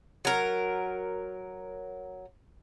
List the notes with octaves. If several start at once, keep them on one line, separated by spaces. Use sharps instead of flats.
F#3 A#4